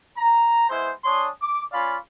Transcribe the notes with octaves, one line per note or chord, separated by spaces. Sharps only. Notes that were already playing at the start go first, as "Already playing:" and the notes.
A#5
G#3 B3 E4 C5
D4 G#4 C#5 C6 D#6
D6
C#4 F4 D5 F5 B5